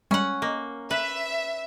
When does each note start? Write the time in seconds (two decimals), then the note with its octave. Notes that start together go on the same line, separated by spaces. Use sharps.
0.11 G3 G#3 C#4 F#5 C#7
0.42 A#3 D#5
0.91 B4 E5